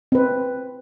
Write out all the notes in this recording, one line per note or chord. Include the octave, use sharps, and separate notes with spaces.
C4 B4